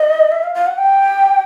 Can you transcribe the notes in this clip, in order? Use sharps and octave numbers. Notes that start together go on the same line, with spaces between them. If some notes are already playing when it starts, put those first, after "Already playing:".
Already playing: D#5
E5
F5
F5
F#5
G5